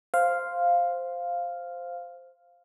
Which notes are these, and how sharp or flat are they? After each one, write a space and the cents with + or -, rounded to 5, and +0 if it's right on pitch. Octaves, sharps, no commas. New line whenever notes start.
C5 +0 F5 +0